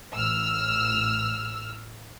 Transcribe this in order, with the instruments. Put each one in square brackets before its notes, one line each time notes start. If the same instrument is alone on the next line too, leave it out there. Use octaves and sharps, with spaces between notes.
[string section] A1 E6 F6